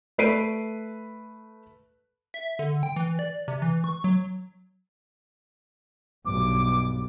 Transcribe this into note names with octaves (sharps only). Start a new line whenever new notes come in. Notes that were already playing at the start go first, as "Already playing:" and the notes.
A3 B4 C7 D7 D#7
E5
D3
G5
E3
D5
C3
E3
C#6
F#3
B1 G2 D6